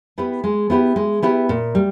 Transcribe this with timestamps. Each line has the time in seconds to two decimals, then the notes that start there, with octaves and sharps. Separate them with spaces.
0.18 B3 E4 G4 B4
0.44 G#3
0.70 B3 E4 G4 B4
0.96 G#3
1.22 B3 E4 G4 B4
1.49 A#2
1.75 G3